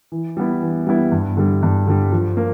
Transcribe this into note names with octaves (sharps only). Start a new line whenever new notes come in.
E3
G3 B3 E4
E3
G3 B3 E4
G2
D3 G3
G2
D3 G3
F3
A#3